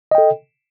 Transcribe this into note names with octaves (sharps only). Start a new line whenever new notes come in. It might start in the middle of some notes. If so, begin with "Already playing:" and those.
A4 D#5 G5